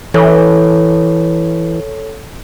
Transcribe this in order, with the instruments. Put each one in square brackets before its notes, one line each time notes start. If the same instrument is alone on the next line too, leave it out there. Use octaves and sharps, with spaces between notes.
[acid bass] E3 [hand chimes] A4 C#5